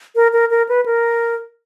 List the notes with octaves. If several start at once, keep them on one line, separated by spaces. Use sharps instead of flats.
A#4
A#4
A#4
B4
A#4